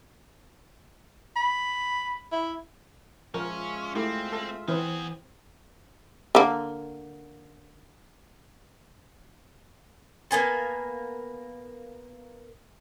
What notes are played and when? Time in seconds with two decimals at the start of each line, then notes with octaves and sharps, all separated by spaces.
1.36 B5
2.32 E4
3.34 F3 G#3 C#4 F4 A#4 E5
3.95 A3 C4 E4 G4
4.33 A4
4.68 E3 B3 C4 G#4 B4 C5
6.35 D3 A#3
10.31 A#3 B3 G#5 A5